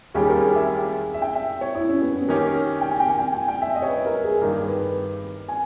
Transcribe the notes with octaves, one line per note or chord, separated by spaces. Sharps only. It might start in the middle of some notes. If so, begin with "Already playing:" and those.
D#2 D#3 G3 C#4 G4 G#4
A#4
G#4
E5
E5
G5
E5
C#5
E4
C#4
B3
C#4
D#3 A#3 C#4 G4 A#4
G5
G#5
G5
G#5
G5
G#5
G5
E5
D#5
C#5
B4
A#4
G#4
G2 D#3 A#3 A#4
B4
G#5